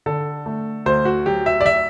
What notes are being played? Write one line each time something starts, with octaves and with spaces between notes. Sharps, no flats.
D3 A4
A3
D2 C5
F#4
F#3 G4
E5
D5
E5